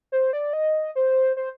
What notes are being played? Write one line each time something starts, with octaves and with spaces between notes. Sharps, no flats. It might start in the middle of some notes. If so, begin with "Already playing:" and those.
C5
D5
D#5
C5
C5